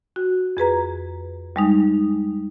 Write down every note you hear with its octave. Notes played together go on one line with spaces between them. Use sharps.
F#4
F2 G#4 B4 A#5
G3 G#3 D#4